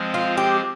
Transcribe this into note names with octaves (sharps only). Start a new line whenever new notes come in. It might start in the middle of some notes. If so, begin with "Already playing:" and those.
Already playing: F3 G#3 C4
F4
G4